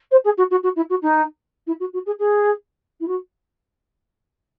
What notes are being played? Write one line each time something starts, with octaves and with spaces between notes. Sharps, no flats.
C5
G#4
F#4
F#4
F#4
E4
F#4
D#4
E4
F#4
F#4
G#4
G#4
E4
F#4